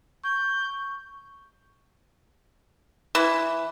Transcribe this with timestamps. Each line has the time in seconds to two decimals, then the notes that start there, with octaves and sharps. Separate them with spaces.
0.24 C#6 G6
3.15 E3